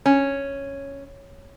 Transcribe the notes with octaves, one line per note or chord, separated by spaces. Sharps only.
C#4